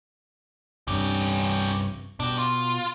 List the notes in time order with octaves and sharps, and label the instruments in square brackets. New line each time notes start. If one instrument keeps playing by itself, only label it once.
[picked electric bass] C2 G2 C3 [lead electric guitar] C#4 G4
[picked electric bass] B2 [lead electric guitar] D4 G4
[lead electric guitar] F4